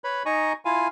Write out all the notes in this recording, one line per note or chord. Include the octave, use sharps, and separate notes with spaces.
B4 C#5 B5
D#4 D#5 G#5 A#5 C#6
E4 F4 F5 G#5